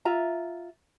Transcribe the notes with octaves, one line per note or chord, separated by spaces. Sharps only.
F4 E5 A#5